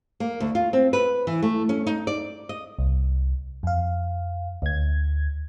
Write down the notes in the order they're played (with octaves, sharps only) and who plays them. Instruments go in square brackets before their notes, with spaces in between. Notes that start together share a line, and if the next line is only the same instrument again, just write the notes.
[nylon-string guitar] A#3
D2
F4
C4
B4
E3
A3
C#4
D#4
D5
D#5
[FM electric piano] C2
F2 F5
D2 G#6